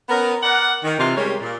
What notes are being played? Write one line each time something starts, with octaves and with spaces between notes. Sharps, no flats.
B3 C#4 A#4
A#4 D5 F#5
D#3
C3 E3 F4
G3 G#3 C#4 G4 A#4 C#5
A#2